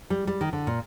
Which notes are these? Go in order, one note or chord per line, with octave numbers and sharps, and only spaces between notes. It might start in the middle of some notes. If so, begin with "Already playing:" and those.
G3
G3
D#3
D3
A#2